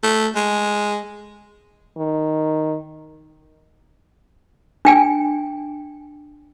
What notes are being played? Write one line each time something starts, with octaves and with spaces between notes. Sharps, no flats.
A3
G#3
D#3
D4 G5 G#5